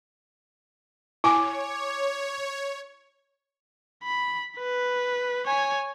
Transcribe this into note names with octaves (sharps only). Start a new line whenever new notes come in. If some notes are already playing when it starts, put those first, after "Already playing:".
E4 C#5 G#5 D6
B5
B4
C#5 G#5